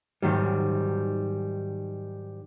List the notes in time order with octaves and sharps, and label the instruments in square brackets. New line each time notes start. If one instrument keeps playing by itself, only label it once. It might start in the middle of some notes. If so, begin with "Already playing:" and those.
[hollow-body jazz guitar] G#2 D#3 F#3 G3